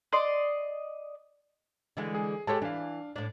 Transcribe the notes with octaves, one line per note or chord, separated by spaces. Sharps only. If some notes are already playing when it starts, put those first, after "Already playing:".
D5 D#5 C6
D3 E3 G#3
G#4
G#3 G4 A4 C#5 A5
E3 D4 F5
A2 D4